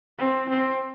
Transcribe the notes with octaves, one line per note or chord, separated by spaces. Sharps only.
C4
C4